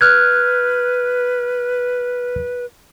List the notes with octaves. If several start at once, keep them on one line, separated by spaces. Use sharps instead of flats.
B4 F6 F#6 G#6